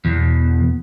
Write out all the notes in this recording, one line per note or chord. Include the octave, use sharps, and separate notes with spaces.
E2 B2